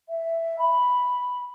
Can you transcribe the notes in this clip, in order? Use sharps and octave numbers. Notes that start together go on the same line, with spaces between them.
E5
B5